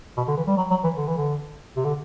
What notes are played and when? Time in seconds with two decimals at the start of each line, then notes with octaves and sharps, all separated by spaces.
0.17 B2
0.28 D3
0.37 E3
0.47 G3
0.57 F#3
0.70 F#3
0.84 E3
0.97 D3
1.07 E3
1.17 D3
1.76 C3
1.85 D3